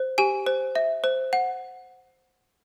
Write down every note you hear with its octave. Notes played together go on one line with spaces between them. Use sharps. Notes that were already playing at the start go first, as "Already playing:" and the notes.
Already playing: C5
G4 G#5
C5
E5
C5
F#5